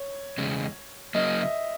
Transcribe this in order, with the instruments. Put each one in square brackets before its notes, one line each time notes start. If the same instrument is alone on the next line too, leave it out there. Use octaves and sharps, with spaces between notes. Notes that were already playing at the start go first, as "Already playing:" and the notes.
Already playing: [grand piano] C#5
[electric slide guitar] E2 C#3 G#3
[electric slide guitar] C#3 F#3 A#3 [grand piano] D#5
[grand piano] E5